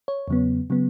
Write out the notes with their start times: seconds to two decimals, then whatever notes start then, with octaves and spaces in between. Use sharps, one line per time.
0.08 C#5
0.28 E2 C#3 F#3 B3
0.70 C#3 F#3 B3